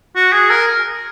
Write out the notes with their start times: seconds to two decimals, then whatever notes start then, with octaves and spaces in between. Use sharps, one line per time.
0.16 F#4
0.33 G#4
0.50 A#4